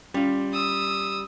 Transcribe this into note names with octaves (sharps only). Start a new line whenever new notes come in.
G3 C#4 F4
D#6 E6